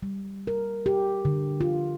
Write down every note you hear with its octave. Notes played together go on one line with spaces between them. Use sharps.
G3
A#4
G4
D3
F4